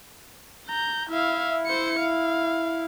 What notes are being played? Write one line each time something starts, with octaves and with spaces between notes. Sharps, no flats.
A#5 G6
E4 E5 F5
C5 C#7
F5